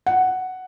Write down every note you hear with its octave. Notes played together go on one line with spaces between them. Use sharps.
F#5